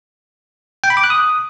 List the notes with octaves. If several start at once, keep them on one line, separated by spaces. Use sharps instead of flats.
G5
B5
D6
F#6
D#6